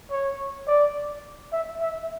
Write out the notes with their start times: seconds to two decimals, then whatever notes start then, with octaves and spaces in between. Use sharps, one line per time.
0.11 C#5
0.67 D5
1.53 E5
1.81 E5